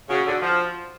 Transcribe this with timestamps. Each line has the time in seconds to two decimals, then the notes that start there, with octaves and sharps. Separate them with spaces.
0.09 C#3 F#4
0.25 D3
0.41 F3